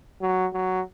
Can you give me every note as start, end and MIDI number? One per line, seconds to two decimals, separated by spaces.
0.22 0.46 54
0.54 0.81 54